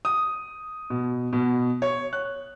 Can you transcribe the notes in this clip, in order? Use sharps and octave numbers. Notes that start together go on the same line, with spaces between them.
D#6
B2
B2
C#5
F#6